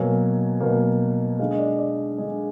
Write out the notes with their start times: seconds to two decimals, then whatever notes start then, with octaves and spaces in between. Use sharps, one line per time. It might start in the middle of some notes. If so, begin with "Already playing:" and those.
Already playing: B2 F#3 A#3 G#5
0.60 B2 F#3 A#3
1.39 D3 G#3 F5
1.51 D#5
1.59 D5
1.78 D5
2.18 D3 G#3 G#4